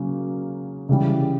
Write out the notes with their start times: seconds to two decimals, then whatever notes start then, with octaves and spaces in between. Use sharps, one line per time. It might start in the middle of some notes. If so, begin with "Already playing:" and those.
Already playing: C#3 F#3 A#3 C#4
0.89 C#3 E3 G3